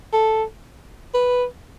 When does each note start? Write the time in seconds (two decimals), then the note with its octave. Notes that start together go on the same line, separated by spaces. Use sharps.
0.13 A4
1.14 B4